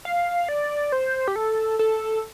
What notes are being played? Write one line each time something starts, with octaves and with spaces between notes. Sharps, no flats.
F5
D5
C5
G4
A4
A4